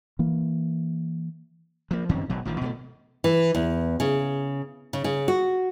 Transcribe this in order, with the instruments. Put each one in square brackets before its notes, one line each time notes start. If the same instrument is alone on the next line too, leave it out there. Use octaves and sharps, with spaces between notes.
[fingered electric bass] E3 A#3
[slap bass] F3 A#3
F#2 D#3 C4 C#4
G#1 B2 F#3
A1 D#3 F3
B2 F#3 A3
[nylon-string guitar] E3
E2
C#3
C#3
C#3
F#4